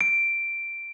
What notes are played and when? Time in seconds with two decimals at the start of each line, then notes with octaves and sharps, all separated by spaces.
0.01 D7